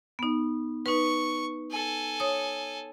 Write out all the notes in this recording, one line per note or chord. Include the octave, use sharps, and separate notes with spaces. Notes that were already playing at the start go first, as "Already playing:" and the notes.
B3 D#4
D#4 B4 C#6
A4 G#5
C#5 D#6